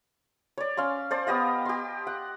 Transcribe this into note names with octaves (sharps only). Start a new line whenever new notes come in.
C#5 D5
C#4 F5 C6
C5 D5 A5
B3 G4 D#5 F5
G4 C6
F#5